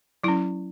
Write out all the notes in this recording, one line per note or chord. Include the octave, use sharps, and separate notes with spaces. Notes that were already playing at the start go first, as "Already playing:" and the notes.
F#3 C#4 E4